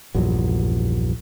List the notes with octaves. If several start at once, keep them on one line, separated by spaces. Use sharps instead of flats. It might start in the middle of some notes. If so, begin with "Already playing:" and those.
A#1 E2 G2 F#3